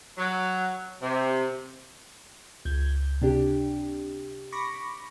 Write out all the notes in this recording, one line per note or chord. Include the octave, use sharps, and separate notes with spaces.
F#3
C3
C#2 G6 G#6
C3 D4 G4
B5 C#6 D6 A#6